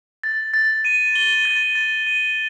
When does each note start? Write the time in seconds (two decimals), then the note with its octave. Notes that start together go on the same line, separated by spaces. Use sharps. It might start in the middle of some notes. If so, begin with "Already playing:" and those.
0.23 A6
0.54 A6
0.85 D#7
1.15 G7
1.45 A6
1.75 A6
2.07 D#7